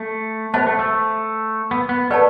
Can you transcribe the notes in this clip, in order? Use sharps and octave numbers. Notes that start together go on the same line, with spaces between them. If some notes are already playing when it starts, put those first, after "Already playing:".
Already playing: A3
B3 C5 E5 A5
A3
A3
B3
B3
A3 B4 D5 F#5 A5